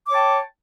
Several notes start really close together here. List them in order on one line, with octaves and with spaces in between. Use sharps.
D6 C#5 A5 G5